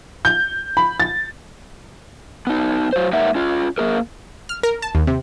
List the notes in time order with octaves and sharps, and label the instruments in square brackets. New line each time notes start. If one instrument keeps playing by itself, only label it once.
[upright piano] G6
B5
A6
[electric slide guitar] B3 D#4
F#3 C5
G#3 A#3 D#4 A#4 E5 F#5
C#4 F4
A#3 G#4 A#4
[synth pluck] F6
A#4
A5
D#2
C3